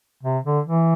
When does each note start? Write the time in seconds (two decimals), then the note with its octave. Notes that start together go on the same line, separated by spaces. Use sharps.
0.23 C3
0.45 D3
0.66 E3